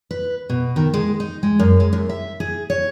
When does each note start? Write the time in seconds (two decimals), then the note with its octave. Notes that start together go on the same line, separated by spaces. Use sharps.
0.11 B4
0.50 B2
0.76 D#3
0.94 G#3
1.20 D#4
1.43 G#3
1.59 F#2
1.80 G#3
1.93 F#2
2.09 E5
2.40 G#4
2.70 C#5